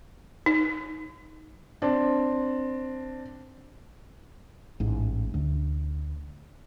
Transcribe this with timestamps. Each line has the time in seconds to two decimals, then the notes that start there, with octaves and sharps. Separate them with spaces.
0.46 D#4
1.82 C4 D4
4.80 A1 G#2
5.34 D2